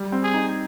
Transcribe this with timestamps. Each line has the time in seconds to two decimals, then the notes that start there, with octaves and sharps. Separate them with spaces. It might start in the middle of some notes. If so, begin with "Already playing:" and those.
Already playing: G3
0.12 C4
0.23 G#4
0.34 D#4